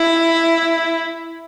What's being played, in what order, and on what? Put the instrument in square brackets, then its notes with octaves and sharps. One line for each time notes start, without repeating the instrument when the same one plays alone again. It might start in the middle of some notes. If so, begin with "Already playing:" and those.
Already playing: [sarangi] E4